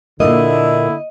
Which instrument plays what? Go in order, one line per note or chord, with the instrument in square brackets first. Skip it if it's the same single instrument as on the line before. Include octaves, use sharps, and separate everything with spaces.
[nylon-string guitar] A#2 A#3 [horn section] D3 E4 [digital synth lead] D#5